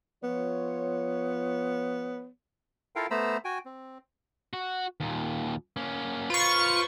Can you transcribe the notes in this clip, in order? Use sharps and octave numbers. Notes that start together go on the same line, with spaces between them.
F3 B3 F4 C#5
E4 F4 A4 A#4 F5 G5
A3 B3 C5 A#5 B5 E6
F#4 G5 G#5
C4
F#4
D#2 A#2
A#3 C#4
F4 B4 C5 C#6